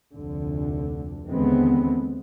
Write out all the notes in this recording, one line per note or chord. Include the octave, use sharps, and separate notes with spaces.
F1 D2 D3
D#2 D3 E3 G#3 B3 C4